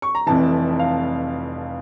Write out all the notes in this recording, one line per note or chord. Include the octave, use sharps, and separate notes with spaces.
C#6
A#5
F1 F2 E3 A5
F5